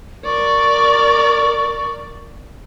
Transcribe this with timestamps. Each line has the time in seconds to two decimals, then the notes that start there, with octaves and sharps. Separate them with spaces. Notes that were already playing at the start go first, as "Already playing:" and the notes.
0.25 A#4 D5 C#6